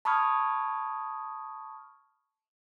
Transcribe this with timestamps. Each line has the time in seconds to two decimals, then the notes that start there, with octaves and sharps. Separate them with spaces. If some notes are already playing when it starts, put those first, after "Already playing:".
0.05 A5 B5 C#6 D#6 F6 G#6